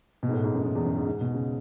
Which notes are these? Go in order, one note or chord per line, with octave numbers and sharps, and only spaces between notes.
B2
G#2
A2
G#2
F#2
G#2
F#2
E2
F#2
G#2
G#2
B2
C#3